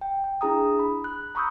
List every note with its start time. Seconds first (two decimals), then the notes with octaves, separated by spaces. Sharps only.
0.01 G5
0.24 G5
0.41 D4 E4 G#4 A#5 D#6
0.79 B5
1.04 F#6
1.35 A#5 B5 C#6 D#6 E6 G6